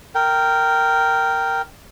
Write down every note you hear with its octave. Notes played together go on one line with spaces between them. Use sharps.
A#4 G5